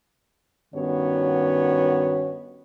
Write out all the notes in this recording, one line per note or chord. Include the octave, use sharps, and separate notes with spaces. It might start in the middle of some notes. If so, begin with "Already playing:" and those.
G2 D#3 B3 C#4 F#4 C#5